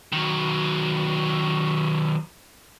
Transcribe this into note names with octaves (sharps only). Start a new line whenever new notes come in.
D#3 F#3